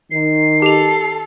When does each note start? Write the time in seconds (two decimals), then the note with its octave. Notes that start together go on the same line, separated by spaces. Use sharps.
0.11 D#3 C7
0.62 G4 A4 F7